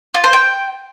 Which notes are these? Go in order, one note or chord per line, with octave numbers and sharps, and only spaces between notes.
F4
C5
G5